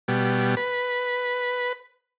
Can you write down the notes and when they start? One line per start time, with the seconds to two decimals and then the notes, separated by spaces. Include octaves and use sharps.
0.08 B2 G3
0.57 B4